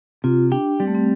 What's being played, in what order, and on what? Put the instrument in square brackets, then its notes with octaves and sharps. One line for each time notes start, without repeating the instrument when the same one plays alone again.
[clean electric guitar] C3 [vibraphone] F4
[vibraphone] D4 [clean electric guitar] G4
[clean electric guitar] G3 [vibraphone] C4
[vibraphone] A3
C4